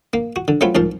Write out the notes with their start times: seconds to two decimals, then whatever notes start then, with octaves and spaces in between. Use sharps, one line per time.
0.13 A#3
0.36 F#4
0.48 D3
0.61 F#3 A3 C4 F4 B4
0.75 C2 G#2 F3 A#4 A5